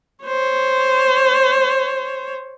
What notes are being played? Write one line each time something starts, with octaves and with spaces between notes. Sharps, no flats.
C5 C#5